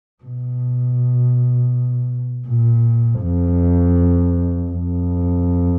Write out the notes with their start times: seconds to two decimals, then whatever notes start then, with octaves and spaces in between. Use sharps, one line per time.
0.24 B2
2.48 A#2
3.21 F2
4.71 F2